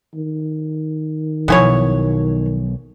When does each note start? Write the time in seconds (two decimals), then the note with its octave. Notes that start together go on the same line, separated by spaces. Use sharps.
0.14 D#3
1.48 B1 B2 F3 B3 E4 C#5 G#5